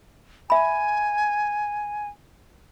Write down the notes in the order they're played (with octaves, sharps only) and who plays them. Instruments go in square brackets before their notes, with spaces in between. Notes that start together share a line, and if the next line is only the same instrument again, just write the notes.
[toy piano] E5 B5 [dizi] G#5